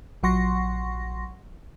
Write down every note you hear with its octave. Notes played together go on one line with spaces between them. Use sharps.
A#1 F#3 F#5 C6 C#6 A#6